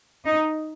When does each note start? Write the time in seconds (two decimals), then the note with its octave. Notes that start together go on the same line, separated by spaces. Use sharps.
0.25 D#4